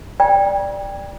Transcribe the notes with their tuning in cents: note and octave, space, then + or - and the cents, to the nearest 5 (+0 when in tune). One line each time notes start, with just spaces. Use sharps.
D5 +0 G5 +20 A#5 +45